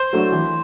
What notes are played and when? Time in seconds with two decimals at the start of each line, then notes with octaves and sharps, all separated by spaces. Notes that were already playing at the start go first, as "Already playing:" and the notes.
Already playing: C5
0.13 F#3 A3 D4 F#4
0.32 E3